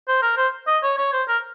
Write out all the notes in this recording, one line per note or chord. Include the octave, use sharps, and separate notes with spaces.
C5
A#4
C5
D#5
C#5
C#5
C5
A#4